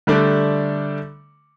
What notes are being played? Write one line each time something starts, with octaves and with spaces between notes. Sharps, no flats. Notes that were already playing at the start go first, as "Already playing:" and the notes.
D3 G3 A3 D4